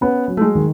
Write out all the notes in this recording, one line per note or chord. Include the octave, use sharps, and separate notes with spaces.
B3 C#4
F#3
A3
G#3
D#3